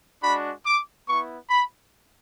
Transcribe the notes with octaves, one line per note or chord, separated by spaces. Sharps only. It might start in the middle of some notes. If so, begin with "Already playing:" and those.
G#3 D4 F#4 B5
D6
B3 E4 C#6
B5